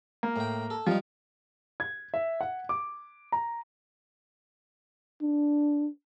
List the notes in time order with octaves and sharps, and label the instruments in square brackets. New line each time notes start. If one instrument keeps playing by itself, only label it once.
[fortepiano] A#3
[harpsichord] A2 G5
A4
[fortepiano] F3 [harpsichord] G3 D#4
[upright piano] G#6
E5
F#5
D6
A#5
[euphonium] D4